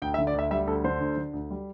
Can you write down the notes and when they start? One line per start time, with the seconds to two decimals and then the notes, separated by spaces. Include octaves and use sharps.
0.02 D2 G5
0.14 E5
0.18 D3
0.27 D5
0.35 D2 E5
0.51 G3 E5
0.67 D2 A4
0.84 D3 C5
1.01 D2
1.17 D3
1.33 D2
1.51 G3